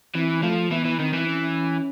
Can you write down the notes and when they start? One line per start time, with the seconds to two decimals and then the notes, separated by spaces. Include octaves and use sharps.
0.15 E3 C4
0.43 F3 A3
0.71 E3 B3
0.85 E3
0.99 D#3 C4
1.13 E3
1.27 C#4